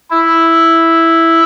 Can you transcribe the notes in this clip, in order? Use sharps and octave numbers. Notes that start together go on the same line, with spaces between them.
E4